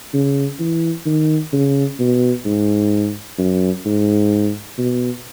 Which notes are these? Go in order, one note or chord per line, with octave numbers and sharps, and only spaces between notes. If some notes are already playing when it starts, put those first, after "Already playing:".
C#3
E3
D#3
C#3
B2
G#2
F#2
G#2
B2